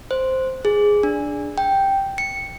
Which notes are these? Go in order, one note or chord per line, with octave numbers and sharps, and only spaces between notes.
C5
G#4
D4
G5
C#7